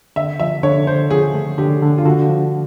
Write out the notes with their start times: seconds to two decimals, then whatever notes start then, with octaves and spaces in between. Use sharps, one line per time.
0.16 D3 E5
0.40 F3 E5
0.63 D3 C#5
0.87 D3 C5
1.10 F3 G#4
1.35 A3
1.58 D3 G4
1.82 D3
1.98 F4
2.05 D3 F#4
2.30 F3